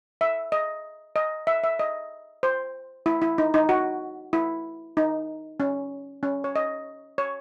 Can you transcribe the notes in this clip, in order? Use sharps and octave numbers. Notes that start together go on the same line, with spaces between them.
E5
D#5
D#5
E5
E5
D#5
C5
E4
E4
D#4
D#4
F#4
E4
D#4
C#4
C#4
C#5
D#5
C#5